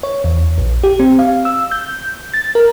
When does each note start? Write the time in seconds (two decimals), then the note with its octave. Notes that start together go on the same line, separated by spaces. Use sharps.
0.03 C#5
0.24 E2
0.58 A#1
0.83 G4
0.99 C4
1.19 F5
1.45 E6
1.71 G6
2.34 A6
2.55 A#4